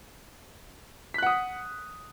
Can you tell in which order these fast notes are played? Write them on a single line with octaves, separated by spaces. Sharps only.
B6 F#6 F#5 D#6